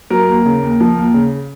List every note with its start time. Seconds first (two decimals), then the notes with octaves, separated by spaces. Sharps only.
0.10 F#3 A#4
0.28 D#2
0.46 C#3
0.62 D#2
0.80 F3
0.98 D#2
1.14 C#3